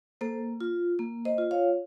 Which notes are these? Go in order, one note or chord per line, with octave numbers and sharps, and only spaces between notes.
A#3 A4 C5
F4
A#3
C5 D#5
F4
C#5 F5